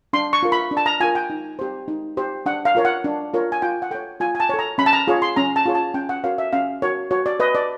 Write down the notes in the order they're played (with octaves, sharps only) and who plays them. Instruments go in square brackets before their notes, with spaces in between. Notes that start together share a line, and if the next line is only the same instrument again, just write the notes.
[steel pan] D4 C6
C#6
F4 A#4
B5
D4
A5
A#5
F4 A#4 G#5
G5
D#4
G4 C5
D#4
G4 C5
D4 F#5
F5
F4 A#4 C#5
F#5
D4
F4 A#4 C#5
G#5
F4 G5
F#5
A4 C#5 G5
F4 G#5
G#5
A5
A4 C#5
A#5
C#4 B5
A5
A#5
F4 G#4 C#5
C6
C#4 A#5
A5
F4 G#4 C#5
A5
C#4 G5
F#5
F#4 A#4 C#5 F5
E5
C#4 F5
F#4 A#4 C#5
F#4 C#5
D5
B4 D#5
D5